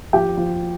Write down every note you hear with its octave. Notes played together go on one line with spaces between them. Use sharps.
F3 G4 G5
F3